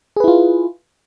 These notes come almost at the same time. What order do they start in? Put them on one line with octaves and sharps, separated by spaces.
G#4 B4 E4 F4